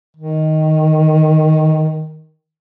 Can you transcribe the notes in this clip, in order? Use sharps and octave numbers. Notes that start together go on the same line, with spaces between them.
D#3